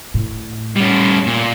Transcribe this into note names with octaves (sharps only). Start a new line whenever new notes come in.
A2
G3 C#4
A#2